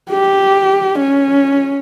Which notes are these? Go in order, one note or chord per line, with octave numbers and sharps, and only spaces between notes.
G4
C#4